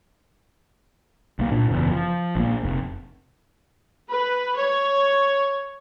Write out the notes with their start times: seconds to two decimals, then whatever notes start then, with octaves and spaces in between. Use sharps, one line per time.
1.39 B1 A#3
1.51 A#2 D4
1.69 F#1 E2
1.91 F3
2.35 A#1 A#3
2.63 F1
4.09 B4
4.57 C#5